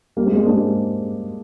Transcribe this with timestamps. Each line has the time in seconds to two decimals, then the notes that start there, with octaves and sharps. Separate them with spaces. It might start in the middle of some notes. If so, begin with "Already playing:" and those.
0.17 G3 A#3
0.26 G#3 C4
0.36 G#3 C4
0.46 A#3 D4
0.55 G#3 C4